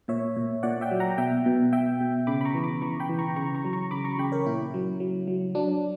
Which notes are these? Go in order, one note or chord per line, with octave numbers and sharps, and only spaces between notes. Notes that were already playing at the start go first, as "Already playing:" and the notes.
A#2 C#5 E5
A#2
A#2 D5 F#5
E5 G5
F#3
F#5 A#5
B2 E5 G5
B2
B2 E5 G5
B2
C#3 B5 D6
B5
A#5 C#6
E3
B5 D6
E3 A#5 C#6
G5 B5
E3
A#5 C#6
C#3 A#5 C#6
A#5 C#6
F#3
A#5 C#6
C#3 B5 D6
A#5 C#6
C#3 G5 B5
A#4 C#5
A#2 E4
F#3
F#3
F#3
F#3 D4